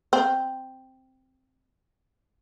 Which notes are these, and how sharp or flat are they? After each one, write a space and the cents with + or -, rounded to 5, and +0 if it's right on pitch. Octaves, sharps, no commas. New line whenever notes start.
C4 +0